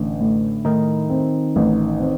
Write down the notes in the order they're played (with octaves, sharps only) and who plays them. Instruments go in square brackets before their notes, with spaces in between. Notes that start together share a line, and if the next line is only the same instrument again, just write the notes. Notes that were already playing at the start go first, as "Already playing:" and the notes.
Already playing: [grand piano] A1 [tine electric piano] D3 D4
[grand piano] A2
[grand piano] A2 [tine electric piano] D#3 D#4
[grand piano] C4
A1
C4